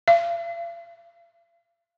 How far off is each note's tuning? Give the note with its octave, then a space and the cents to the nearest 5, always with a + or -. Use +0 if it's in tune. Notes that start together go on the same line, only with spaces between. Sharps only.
F5 -45